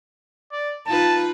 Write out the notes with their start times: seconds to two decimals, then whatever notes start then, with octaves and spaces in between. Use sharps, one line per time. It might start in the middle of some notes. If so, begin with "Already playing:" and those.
0.52 D5
0.87 D#4 F4 B4 A5